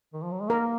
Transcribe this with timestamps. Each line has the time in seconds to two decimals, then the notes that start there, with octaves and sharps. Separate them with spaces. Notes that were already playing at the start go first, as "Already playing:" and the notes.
0.14 D#3
0.23 F3
0.32 F#3
0.41 G#3
0.50 A#3 A#4